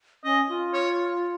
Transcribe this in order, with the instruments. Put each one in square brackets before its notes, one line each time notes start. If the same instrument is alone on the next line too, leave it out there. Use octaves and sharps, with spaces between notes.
[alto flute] C#4 [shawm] D#5
[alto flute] F4
[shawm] C#5